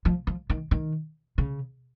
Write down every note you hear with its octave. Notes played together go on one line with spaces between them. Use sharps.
F3
F3
D#3
D#3
C#3